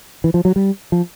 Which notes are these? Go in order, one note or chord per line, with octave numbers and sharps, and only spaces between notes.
E3
F3
F#3
G3
F3